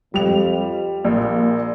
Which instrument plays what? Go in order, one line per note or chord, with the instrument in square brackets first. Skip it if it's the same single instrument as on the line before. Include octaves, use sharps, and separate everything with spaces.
[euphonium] F2 [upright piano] G3 F7
[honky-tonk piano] A#1 [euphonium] A#3